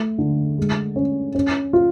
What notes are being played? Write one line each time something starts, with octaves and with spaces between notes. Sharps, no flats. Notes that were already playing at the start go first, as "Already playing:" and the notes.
Already playing: A3
D3
G#3
C#4
C#4
F4